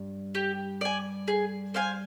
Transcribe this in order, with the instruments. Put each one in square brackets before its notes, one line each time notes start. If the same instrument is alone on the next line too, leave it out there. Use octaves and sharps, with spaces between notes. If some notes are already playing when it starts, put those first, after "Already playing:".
Already playing: [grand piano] G2
[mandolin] G4
D5 G#5
G#4
C5 F5 G#5